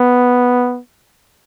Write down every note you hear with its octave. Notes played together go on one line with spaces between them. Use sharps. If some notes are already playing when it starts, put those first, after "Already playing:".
Already playing: B3